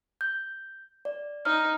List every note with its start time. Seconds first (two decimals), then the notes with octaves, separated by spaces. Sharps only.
0.21 G6
1.05 D5
1.45 D#4 F6